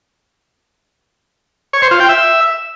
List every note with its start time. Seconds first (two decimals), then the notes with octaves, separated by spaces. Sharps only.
1.73 C#5
1.82 C5
1.91 F4
2.00 G5
2.09 E5